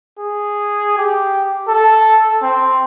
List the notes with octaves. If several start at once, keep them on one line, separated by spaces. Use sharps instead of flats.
G#4
G4
A4
C4